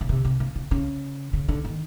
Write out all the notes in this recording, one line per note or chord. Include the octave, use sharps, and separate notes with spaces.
C#3
C3
C3
C#3
C#3
C#3
C#3
D3
D#3